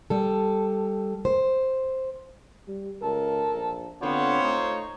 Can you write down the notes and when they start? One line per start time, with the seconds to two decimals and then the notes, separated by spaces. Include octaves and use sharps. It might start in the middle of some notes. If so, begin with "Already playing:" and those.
0.10 G3 A4
1.25 C5
2.68 G3
3.02 C#2 A4 A#4
3.53 A#1
4.02 D3 B3 C4 F4 C5 C#5
4.43 A3 D#4